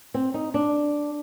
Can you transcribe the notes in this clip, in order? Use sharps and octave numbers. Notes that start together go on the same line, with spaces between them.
C4
D#4
D4